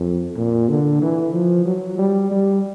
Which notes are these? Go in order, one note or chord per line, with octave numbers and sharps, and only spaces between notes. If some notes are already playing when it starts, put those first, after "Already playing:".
Already playing: F2
A#2
D3
E3
F3
F#3
G3
G3